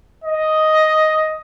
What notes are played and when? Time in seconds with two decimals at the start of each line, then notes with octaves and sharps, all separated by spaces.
0.24 D#5